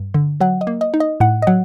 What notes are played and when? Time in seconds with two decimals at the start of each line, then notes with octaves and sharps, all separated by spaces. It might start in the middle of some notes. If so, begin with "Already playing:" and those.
Already playing: G2
0.14 D3
0.41 F#3 F#5
0.61 D#5
0.67 A#3
0.81 D#5
0.94 D#4
1.00 D#5
1.20 A2 F#5
1.42 D#5
1.47 F#3 F#5